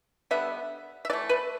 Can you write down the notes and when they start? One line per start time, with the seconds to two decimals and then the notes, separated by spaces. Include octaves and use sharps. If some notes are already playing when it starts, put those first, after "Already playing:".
0.31 D3 G3 B3 E5
1.05 E5
1.10 E3 A3 D5
1.29 B4